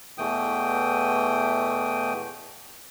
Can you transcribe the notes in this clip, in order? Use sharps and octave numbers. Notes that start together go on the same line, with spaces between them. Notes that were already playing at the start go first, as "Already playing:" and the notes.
E2 B2 E3 A3 G5 D#6